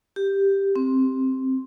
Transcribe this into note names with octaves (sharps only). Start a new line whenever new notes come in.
G4
C4